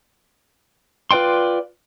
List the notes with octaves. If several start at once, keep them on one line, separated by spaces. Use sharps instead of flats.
F4 B4 D5 G5 C6